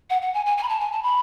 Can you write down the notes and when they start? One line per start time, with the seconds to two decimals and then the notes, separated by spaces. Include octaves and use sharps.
0.10 F#5
0.22 F#5
0.34 G#5
0.46 G#5
0.57 G#5
0.63 B5
0.69 A5
0.80 G#5
0.92 A5
1.03 B5